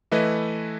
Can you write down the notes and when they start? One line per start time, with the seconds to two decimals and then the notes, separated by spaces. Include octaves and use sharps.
0.12 E3 A3 E4 B4 D#5